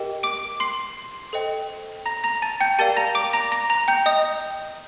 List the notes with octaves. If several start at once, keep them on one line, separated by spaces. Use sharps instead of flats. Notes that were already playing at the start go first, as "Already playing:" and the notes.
Already playing: G4 A#4 D#5 G5
D6 D7
C6 C7
A4 C5 D#5 G5
A#5 A#6
A#5 A#6
A5 A6
G5 G6
G4 A#4 D5 F5 A5 A6
A#5 A#6
D6 D7
A#5 A#6
A#5 A#6
A#5 A#6
G5 G6
D#5 D#6